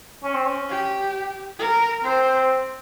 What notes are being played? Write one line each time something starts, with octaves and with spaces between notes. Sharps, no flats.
C#4
C4
C#4
G4
A#4
C4 C5